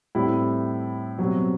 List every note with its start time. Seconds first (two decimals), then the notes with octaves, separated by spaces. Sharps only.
0.15 A2 G3 C4 E4
1.18 B2 F#3 G3 C4 F#4